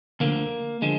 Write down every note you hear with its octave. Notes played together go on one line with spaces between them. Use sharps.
D2 D3 F3 A#3
D3 F3 G#3